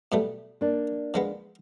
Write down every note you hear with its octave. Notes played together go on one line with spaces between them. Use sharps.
B2 G3 A3
A#3 D4
F3 G#3 B3